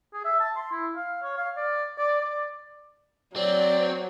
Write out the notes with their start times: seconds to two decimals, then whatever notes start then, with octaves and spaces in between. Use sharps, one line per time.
0.14 G#4
0.25 E5
0.40 A5
0.56 C6
0.72 E4
0.96 F5
1.23 C#5
1.38 F5
1.57 D5
1.98 D5
2.21 D5
3.36 F#3 C4 D5